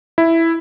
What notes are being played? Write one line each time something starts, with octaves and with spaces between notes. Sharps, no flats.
E4